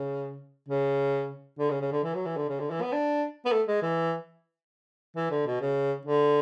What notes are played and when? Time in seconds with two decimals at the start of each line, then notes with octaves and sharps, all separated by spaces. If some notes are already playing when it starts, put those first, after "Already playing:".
Already playing: C#3
0.69 C#3
1.59 D3
1.70 C#3
1.81 C#3
1.92 D3
2.04 E3
2.14 F#3
2.26 E3
2.37 D3
2.49 C#3
2.60 D3
2.71 E3
2.82 B3
2.93 D4
3.46 B3
3.52 A3
3.68 G#3
3.82 E3
5.17 E3
5.31 D3
5.47 B2
5.61 C#3
6.06 D3